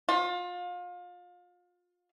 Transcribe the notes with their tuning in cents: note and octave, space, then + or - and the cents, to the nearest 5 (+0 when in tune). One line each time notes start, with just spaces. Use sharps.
F4 +30